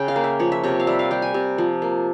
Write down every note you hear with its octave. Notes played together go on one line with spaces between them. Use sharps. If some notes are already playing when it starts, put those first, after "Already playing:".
Already playing: C#3 G5
F5
A#3
E5
F3 C#5
E5
C3 C#5
F5
G3 E5
F5
G3 G5
G#5
C3
F3
A#3